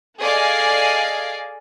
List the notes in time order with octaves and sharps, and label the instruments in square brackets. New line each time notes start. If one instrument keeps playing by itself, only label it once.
[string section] G#4 A4 D5 D#5 F5 G#5